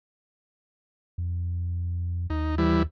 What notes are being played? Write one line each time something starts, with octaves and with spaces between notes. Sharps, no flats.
F2
D#2 D#4
E3 G3 E4